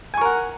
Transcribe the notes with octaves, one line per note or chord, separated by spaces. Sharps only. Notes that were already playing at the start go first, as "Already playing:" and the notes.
A#4 F#5 G#5 C#6